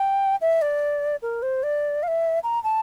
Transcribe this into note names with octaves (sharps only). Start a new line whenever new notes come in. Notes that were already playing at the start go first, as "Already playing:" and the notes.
Already playing: G5
E5
D5
A#4
C5
D5
F5
E5
A#5
A5